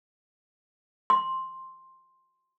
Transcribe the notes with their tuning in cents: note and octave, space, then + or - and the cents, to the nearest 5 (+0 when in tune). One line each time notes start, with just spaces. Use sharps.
C6 +5